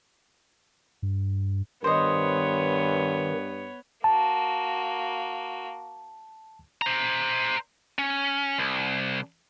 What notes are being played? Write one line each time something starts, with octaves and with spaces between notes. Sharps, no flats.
G2
G2 D#3 B3 C5 C#5 D#5
A#3 F#4 A5
C5 A#5
C#4
C2